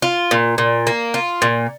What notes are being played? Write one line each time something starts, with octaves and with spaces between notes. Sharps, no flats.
F4
A#2
A#2
A#3
F4
A#2